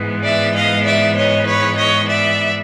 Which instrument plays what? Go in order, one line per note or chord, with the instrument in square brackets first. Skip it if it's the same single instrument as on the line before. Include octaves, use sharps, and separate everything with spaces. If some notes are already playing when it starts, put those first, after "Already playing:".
Already playing: [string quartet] G#2 E3 G#3 B3
D5 E5
D#5 F5
D5 E5
C#5 D#5
B4 C#5
C#5 D#5
D5 E5